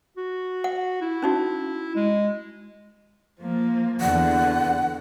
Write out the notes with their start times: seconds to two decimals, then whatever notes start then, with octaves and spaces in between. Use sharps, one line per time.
0.17 F#4
0.64 F#5
1.01 E4
1.22 C#4 D#4 F#4
1.95 G#3
3.40 F3 A#3
4.01 E2 D3 F#5